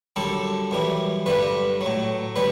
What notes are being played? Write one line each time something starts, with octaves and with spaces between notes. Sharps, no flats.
F#2 D3 G3 A4
F#2 E3 G3
G2 D3 G3 B4
F#3
A2
D3 G3 B4